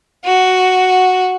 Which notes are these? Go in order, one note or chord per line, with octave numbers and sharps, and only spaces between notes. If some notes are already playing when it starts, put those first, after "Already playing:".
F#4